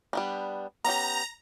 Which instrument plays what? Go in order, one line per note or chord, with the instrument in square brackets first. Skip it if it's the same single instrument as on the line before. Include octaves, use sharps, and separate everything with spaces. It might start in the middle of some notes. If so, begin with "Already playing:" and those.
[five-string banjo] G3 B3 D4
[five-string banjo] B3 C#4 G4 [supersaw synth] A#5